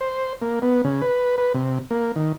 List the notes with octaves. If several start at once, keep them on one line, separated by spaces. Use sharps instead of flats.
C5
A#3
B3
C#3
B4
B4
C3
A#3
D#3